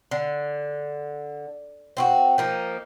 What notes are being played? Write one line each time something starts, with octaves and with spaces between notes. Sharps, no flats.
D3
C4 E4 F#4
F3 A#3 D#4